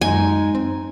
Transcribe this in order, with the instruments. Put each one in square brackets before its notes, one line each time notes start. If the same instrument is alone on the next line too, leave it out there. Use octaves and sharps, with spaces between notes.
[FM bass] F#2 [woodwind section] G#3 D#4 [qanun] G#5
[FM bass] C4